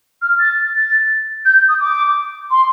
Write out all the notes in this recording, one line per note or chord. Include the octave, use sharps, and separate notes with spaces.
F6
A6
A6
G6
D#6
D6
C6